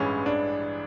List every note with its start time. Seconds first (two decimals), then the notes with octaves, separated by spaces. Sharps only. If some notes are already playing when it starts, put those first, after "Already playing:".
Already playing: A1 G2 E3 G#3 C#4
0.26 D4